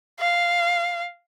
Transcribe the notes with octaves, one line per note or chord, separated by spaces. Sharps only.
F5